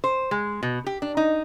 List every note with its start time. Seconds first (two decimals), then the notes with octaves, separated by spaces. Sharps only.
0.04 C5
0.31 G#3
0.63 B2
0.86 G4
1.02 D4
1.17 D#4